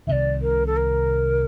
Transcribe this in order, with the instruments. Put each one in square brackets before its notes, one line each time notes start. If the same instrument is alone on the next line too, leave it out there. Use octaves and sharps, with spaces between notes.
[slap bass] C2 C3 D#3 [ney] D5 E5
[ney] A#4
A4
A#4